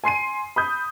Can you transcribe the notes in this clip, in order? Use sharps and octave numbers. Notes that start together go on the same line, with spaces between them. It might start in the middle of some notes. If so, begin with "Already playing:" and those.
G#5 C6 C7 D#7
B5 D#6 G6